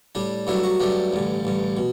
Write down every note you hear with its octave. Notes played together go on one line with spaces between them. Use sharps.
A2 G3 D4
G2 F#3 A3 D4 E4
F#4
G2 F#3 A3 D4 G4
A1 G2 D3
A1 G2 D3
B2